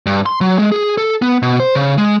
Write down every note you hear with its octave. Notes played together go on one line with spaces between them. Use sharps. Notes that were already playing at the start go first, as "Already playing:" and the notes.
G2
C6
F#3
G#3
G#4
A4
B3
B2
C5
C#3
G#3